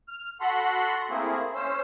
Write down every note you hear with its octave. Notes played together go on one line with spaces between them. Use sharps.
F6
F#4 A4 F#5 B5 C6
A3 A#3 C4 E4 G#4
C#4 C5 E6